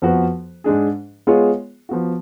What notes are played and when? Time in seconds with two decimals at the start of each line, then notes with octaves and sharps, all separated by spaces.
0.02 F2 F3 B3 F#4 B4
0.64 G#2 G#3 D4 G#4
1.27 G#3 B3 F4 G#4 C#5
1.89 F3 B3 F#4